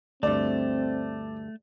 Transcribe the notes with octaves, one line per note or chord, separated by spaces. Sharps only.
D2 G2 A3 C4 D5